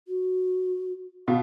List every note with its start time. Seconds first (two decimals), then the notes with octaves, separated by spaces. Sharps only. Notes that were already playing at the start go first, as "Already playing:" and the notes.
0.07 F#4
1.28 B2 F5